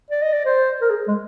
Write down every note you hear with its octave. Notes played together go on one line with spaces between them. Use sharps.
D5
D#5
D5
C5
A#4
G#4
G#3